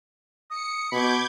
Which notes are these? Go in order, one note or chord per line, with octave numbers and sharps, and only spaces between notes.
D#6 C#7
B2 B5 D6 G6 G#6